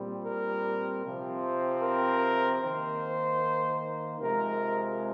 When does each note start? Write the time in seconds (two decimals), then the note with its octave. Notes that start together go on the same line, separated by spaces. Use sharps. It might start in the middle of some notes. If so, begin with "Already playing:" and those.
Already playing: A#2 G3 C4
0.24 A#4
1.03 C3 F3 C4
1.82 A#4
2.62 D#3 A#3 C5
4.20 C3 F3 G#3 A#4